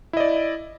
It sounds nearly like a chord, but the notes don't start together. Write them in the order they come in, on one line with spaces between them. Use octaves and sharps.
E4 D#5 D5